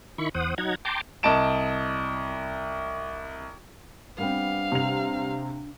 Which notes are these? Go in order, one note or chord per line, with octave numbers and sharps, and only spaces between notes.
D#3 E4 B5 C#6
E2 C5 F#5 D#6
F#3 D#4 F#5 A#5 G#6
G5 A5 A#5 C6 D6
C2 D#5 A5 D7 E7
G3 B3 C4 D4 F5
C3 F7